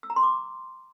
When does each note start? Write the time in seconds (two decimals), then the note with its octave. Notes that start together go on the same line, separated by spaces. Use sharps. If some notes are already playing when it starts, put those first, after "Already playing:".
0.03 E6
0.10 A#5
0.16 C6
0.23 D6